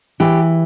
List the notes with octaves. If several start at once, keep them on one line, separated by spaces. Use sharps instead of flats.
E3 G4